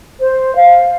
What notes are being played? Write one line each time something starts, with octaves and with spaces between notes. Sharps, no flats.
C5
F5